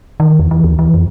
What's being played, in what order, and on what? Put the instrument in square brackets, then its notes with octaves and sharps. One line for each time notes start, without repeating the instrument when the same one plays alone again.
[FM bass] D#3
E2
E3
D#2
E3
F2